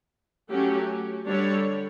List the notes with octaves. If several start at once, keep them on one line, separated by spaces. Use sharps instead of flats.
F#3 A3 C#4 G4
D3 G3 D4 A4 C#5